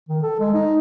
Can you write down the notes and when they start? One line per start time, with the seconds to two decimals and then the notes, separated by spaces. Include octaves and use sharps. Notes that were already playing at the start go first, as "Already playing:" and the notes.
0.09 D#3
0.23 A4
0.40 G#3
0.54 D#4